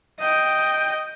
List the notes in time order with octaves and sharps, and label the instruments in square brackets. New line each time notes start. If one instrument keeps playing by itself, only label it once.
[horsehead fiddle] D#5 G5